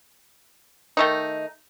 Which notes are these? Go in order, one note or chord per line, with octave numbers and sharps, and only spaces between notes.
D#3 A3 D#4